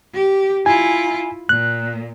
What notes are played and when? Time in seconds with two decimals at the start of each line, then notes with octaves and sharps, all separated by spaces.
0.14 G4
0.66 E4 F4 G#5
1.49 A#2 F#6